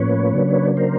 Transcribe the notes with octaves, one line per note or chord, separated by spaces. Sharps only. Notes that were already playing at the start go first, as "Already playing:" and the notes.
Already playing: A2 F3 A#3 C#4 B4 C#5
C#3 F#3 A#3 D4
A#4 C5